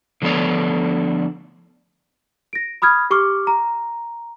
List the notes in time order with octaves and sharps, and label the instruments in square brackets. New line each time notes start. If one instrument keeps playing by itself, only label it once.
[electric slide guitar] D3 F3 A3 B3 D4 C#5
[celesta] A#6 D7
B5 D#6 F6 G#6
G4 C#6 D6 F6
A#5